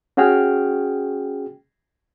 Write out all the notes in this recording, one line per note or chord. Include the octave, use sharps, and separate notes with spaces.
C#4 F#4 G#4 G5 F6